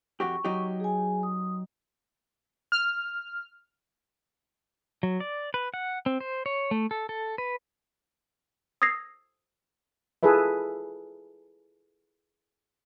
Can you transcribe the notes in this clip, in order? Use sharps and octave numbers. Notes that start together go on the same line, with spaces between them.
F2 F#4 G4 C#6
F#3 D#4 G4
G#4 G#5
D#6
F6
F#3
D5
B4
F#5
C4
C5
C#5
A3
A4
A4
B4
D#6 E6 G#6 A#6 C7
E4 F4 G#4 A4 B4 E5